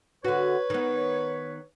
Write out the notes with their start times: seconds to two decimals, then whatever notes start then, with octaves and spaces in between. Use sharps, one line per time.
0.24 D3 F#4 B4 C#5
0.70 D#3 B3